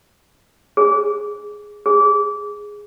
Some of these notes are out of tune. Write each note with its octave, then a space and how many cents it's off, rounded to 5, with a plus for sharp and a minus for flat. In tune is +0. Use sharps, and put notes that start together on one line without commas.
G#4 +0
G#4 -5